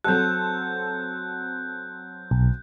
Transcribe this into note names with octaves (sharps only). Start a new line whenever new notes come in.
F#3 C4 A4 F#6 G6
B1